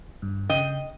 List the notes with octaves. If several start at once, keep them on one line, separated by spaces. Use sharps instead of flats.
G2
C#3 D#5 G5